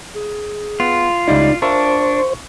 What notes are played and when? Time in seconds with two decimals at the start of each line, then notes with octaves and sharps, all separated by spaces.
0.15 G#4
0.80 B3 F4
1.28 C#2 G3 D#4 E4 D5
1.62 D4 F4 A#4 C5 E5 C#6